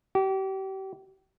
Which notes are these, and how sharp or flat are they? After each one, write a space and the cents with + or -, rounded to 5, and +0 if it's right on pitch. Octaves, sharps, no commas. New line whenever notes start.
G4 -35